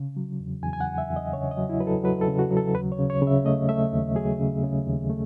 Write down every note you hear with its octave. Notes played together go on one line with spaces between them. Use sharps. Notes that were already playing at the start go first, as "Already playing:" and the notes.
Already playing: C#3
F#3
E2
E2 G#5
G#5
F#5
E2
E5
E2
D#5
C#3 C#5
D#5
F#3
E4
F#3 B4
A4
F#3 B4
A4
C#3
F#4
F#3
A4
D#2 B4
C#5
C#3
C#5
C#3 E5
A3 D#5
A3 E5
D#2
F#3 G#4
C#3
C#3
D#2
A3